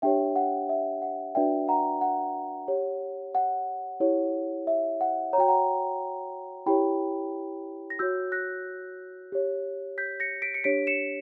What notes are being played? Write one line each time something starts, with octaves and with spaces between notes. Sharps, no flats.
D4 G4 C#5 E5 G5
F#5
E5
F#5
D4 F#4 B4 D5 E5 G5
F#5 A#5
F#5
G4 C#5
F#5
E4 G4 C#5
E5
F#5
F#4 C#5 G5 A#5
F#5 A#5
E4 G4 C#5 G5 B5
A#6
F#4 C#5 E6 G6
F#6 A#6
G4 C#5
G6 B6
A#6 C#7
B6 D7
C#7
D4 G4 C#5 B6 D7
C#7 E7